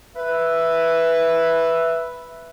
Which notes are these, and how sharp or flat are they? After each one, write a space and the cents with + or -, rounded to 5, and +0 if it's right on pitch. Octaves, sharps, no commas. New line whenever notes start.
B4 +0 E5 +0